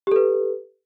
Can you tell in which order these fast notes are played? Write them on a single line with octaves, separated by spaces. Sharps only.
G4 A4 B4